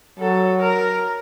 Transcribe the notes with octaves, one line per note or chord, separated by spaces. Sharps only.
F#3 A4
A#4